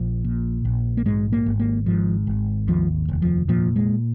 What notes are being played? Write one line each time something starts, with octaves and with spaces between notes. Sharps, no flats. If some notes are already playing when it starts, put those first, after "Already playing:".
Already playing: A#1 F3
A#2
A#1
A#3
G#2 G#3
A#3
G#1
A#3
G#2 F3
G#1
D#2 F3
F1
F3
A#2 F3
G#3